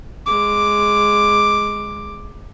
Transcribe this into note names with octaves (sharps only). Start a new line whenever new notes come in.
G#3 D6